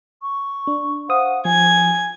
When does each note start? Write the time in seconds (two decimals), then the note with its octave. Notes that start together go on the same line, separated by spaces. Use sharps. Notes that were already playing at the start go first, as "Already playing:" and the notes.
0.22 C#6
0.67 D4
1.09 C5 F5 F#5 D#6
1.45 F3 G#5 G#6